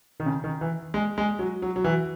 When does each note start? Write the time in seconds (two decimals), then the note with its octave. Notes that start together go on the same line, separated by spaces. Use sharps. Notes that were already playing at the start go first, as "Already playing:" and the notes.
0.20 D#3
0.26 C#3
0.44 D#3
0.61 E3
0.94 G#3
1.18 G#3
1.39 F#3
1.62 F#3
1.76 F#3
1.84 E3